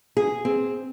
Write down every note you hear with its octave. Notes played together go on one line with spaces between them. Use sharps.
G#4
C4